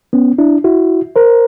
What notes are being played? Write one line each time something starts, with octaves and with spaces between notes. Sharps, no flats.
B3 C#4
D4 E4
E4 F#4
A#4 C5